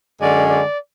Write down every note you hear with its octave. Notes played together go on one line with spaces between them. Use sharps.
F#2 D3 G#3 C#4 D5
D5